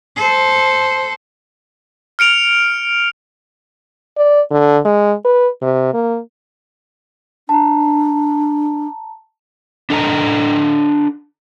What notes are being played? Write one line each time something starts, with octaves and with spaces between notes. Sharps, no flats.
A4 C5
F6 C#7 D7 F7
D5
D3
G#3
B4
C3
A#3
D4 A5 A#5
D4 A4 D#5 A#5